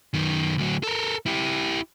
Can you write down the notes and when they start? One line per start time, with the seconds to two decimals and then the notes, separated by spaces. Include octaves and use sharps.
0.14 F#2 D#3
0.58 D2 F#3
0.83 A4 A#4
1.26 E4 G4